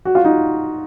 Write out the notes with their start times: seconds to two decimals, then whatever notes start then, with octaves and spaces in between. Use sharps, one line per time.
0.05 F#4
0.15 F4
0.25 D#4